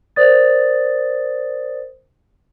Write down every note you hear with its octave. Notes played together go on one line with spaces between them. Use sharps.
A#4 C5 D5 D#6 A6